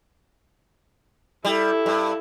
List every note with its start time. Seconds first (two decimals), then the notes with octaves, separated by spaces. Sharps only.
1.45 G3 E4 A4
1.86 G2